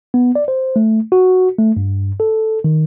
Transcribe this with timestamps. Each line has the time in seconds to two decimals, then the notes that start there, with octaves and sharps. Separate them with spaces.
0.14 B3
0.35 D5
0.48 C5
0.76 A3
1.12 F#4
1.59 A3
1.77 G2
2.20 A4
2.64 D#3